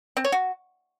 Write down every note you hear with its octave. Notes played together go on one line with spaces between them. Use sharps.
C4
C#5
F#4